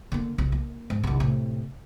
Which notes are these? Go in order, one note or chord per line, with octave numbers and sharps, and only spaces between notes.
D3 A#3
C2
A#3
G#2
C2 D#3
A2 C3